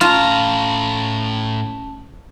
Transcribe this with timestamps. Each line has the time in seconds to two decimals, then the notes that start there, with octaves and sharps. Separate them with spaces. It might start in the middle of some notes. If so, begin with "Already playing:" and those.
0.01 A2 C#4 F4 A5 A#5